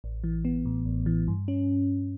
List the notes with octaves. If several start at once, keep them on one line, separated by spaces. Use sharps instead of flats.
A1
E3
B3
A2
A1
E3
G2
C#4